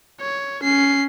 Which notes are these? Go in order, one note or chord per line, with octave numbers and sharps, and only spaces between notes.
C#5
C#4 C7